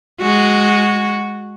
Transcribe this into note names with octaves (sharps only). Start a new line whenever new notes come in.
G#3 F#4